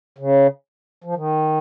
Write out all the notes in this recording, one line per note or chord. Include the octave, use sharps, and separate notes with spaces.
C#3
F3
D#3